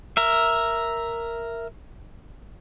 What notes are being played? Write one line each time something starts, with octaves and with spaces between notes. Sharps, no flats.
A#4 E5